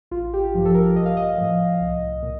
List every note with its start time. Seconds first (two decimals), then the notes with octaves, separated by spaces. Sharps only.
0.11 A1 F4
0.33 G4
0.54 G2 F3
0.65 A4
0.75 A#4
0.96 A#1 D#5
1.06 F5
1.17 D#5
1.38 A2 F3
1.81 C2
2.23 A#2